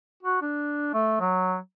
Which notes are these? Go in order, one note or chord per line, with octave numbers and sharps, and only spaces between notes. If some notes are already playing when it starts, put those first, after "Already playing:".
F#4
D4
A3
F#3